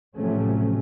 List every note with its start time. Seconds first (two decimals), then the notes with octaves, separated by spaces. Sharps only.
0.16 A1 C3 F3 F#3 A3 C#4